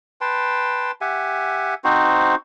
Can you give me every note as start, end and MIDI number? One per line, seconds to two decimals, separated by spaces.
0.21 0.91 71
0.21 0.91 79
0.21 0.91 81
0.21 0.91 84
1.01 1.74 67
1.01 1.74 76
1.01 1.74 78
1.01 1.74 80
1.84 2.35 60
1.84 2.35 63
1.84 2.35 66
1.84 2.35 72